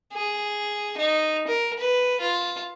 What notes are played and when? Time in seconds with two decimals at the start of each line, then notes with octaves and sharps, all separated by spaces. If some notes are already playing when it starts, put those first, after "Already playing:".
0.13 G#4
0.97 D#4
1.48 A#4
1.79 B4
2.20 F4